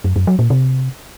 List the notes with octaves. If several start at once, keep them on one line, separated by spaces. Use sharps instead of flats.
F#2
F#2
F#3
A#2
C3